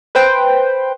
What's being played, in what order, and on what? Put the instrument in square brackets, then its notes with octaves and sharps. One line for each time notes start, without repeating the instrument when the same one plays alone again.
[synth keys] B4 C5 G5